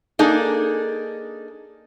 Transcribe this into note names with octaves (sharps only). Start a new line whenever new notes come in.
A#3 D4 D#4 G#4 A4